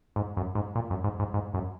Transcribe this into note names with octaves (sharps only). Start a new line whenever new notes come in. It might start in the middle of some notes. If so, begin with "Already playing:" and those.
G#2
F#2
G#2
A#2
F#2
G#2
G#2
G#2
F#2